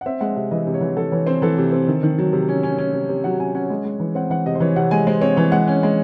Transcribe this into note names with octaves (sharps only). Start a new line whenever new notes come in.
F#5
C4 E5
G#3 F#5
C3 E5
E3 D#5
C3
C#5
E3
E3 A4
E3 C#5
C4 C5
E3 A4
C3
C4
D#3
D#3
F#3
C3
C#4
C#4
C#4
C3
C3
F#3 F#5
C#4 G#5
C#4 F#5
G#3
G#3
E3
C4 F#5
E3 F#5
C3 D#5
C5
E3 C#5
C3 F#5
G#3 G#5
G#3 C5
C4 C#5
E3 C#5
G#3 F#5
C#4
G#3